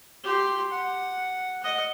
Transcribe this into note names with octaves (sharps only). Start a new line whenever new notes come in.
G4 C6
F#5
D#5 F#5